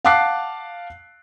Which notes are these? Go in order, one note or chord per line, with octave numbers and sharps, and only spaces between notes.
F5 F#5 A5 D6 F#6 C7